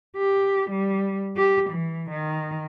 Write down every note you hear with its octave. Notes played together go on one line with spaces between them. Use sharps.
G4
G3
G4
E3
D#3